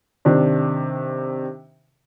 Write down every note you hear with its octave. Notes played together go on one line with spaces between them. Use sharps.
C3 D#3 D4